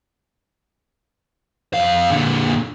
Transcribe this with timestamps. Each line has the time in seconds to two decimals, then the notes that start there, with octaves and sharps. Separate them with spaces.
1.74 F2 F5
2.10 A#2 D3